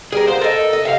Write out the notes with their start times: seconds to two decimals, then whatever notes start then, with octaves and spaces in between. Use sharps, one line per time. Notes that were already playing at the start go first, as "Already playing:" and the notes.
0.13 G3 G#4 A#4
0.27 B3 C5 F5
0.41 A4 A#4 D#5
0.73 D#5
0.85 C3 E5 F5